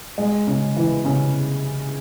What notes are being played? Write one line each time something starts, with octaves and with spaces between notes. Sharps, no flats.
G#3
C#3
E3
C#3